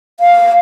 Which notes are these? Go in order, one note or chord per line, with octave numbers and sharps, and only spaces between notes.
F5